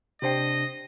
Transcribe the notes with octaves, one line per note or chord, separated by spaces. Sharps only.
C3 D4 G4 C5 D#5 G5 C7